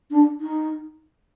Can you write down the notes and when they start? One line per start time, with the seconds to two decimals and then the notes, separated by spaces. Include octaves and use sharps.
0.11 D4
0.40 D#4